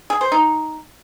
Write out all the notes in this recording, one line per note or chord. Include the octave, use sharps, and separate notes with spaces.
G#4
C5
D#4